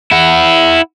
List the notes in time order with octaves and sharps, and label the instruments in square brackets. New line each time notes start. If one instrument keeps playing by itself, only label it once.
[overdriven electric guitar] E4 F#5